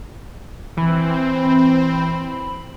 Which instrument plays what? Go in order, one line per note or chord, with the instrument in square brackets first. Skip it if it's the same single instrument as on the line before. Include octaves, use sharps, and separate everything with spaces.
[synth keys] E3 [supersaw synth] C4 [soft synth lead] B5